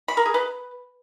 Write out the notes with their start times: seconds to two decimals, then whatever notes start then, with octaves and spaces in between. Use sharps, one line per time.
0.08 B5
0.17 A#4
0.26 G#4
0.34 B4